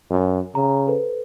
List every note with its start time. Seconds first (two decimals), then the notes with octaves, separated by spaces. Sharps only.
0.10 F#2
0.55 C#3 A#5
0.87 A4 B4 C5